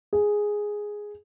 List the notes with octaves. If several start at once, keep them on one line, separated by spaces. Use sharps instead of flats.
G#4